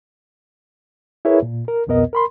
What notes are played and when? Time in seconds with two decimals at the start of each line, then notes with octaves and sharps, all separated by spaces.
1.25 E4 G#4 A#4 B4 C#5 E5
1.43 A#2
1.68 A#4
1.87 C2 F2 B2 B3 A#4 D#5
2.13 A#4 B5 C6